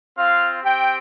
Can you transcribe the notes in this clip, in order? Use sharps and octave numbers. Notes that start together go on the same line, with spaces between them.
C4 F4 F5
C4 G4 G5